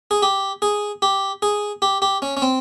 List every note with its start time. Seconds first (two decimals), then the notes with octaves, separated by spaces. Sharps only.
0.11 G#4
0.22 G4
0.62 G#4
1.02 G4
1.42 G#4
1.82 G4
2.02 G4
2.22 C#4
2.37 C#4
2.42 C4